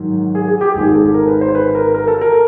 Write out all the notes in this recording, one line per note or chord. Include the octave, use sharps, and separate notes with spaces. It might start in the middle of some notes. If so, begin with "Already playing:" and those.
Already playing: G#2 D#3 F#3
G#4
G#4
G4
G#1 G#2 D#3 G#3 G#4
A4
A#4
B4
C5
B4
A#4
A#4
A4
A#4